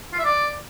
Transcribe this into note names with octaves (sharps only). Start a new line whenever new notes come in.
F4
E5
D5